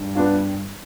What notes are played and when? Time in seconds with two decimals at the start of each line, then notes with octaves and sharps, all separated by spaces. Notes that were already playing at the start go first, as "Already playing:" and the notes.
Already playing: G2
0.15 B3 D4 F4